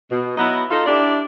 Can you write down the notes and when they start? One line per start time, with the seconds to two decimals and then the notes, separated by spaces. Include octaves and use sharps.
0.11 B2
0.37 F#3 B3 D#4 E4 F#4 D#5
0.71 D#4 F4 A4
0.86 D4 E4 G4 D5